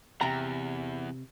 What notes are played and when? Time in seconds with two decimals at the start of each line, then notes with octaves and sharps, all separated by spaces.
0.21 E2 C3 A#5